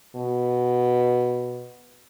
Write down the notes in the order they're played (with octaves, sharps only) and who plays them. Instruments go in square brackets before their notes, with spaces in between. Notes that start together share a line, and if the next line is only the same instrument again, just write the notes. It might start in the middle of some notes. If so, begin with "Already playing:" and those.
[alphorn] B2